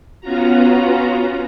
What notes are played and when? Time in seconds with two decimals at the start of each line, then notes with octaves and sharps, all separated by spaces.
0.21 B3 C#4 F4 F#4 A#5